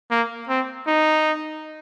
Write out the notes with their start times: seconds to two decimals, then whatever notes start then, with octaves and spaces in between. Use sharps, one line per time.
0.11 A#3
0.49 C4
0.87 D#4